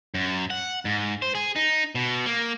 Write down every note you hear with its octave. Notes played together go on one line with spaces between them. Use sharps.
F#2
F#5
G#2
C5
G#4
D#4
B2
A#3